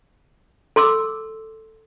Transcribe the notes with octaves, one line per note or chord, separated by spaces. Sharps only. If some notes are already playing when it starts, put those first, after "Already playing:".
A4 C6 D6 E6